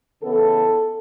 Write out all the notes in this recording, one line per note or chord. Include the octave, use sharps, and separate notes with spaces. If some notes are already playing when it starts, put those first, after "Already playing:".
C#3 E3 B3 A4